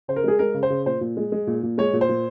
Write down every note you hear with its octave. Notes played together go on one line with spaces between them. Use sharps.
C#3 C5
A#4
G#3 G#4
G#3 A#4
C#3
C5
C#3
A#2 C5
A#2
G#3
G#3
A#2
A#2
G#3 C#5
A#2
C5
A#2